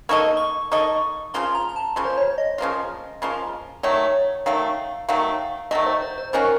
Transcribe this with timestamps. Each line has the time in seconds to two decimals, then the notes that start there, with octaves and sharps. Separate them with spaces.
0.09 A#3 D#4 A4 D#5 C#6
0.37 C#6
0.71 A#3 D#4 A4 D#5 C#6
1.34 C#3 F3 A#3 F4 C6
1.55 A#5
1.69 A#5
1.76 A5
1.96 C#3 F3 A#3 F4
2.05 C5
2.17 C#5
2.38 D#5
2.58 C#3 F3 A#3 F4
3.22 C#3 F3 A#3 F4
3.83 D#3 F#3 A3 C#5
4.46 D#3 F#3 A3 F5
5.09 D#3 F#3 A3 F5
5.71 D#3 F#3 A3 D#5
5.86 C5
6.02 C5
6.18 C5
6.33 D#3 A#3 C#4 F#4 A#4